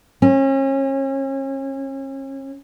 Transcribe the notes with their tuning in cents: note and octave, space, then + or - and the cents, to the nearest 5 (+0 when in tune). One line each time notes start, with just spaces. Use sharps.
C#4 -35